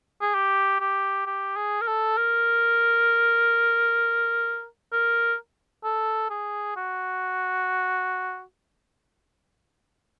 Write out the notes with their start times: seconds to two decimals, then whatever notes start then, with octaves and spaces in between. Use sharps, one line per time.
0.21 G#4
0.34 G4
0.80 G4
1.26 G4
1.56 G#4
1.81 A#4
1.87 A4
2.17 A#4
4.92 A#4
5.84 A4
6.30 G#4
6.77 F#4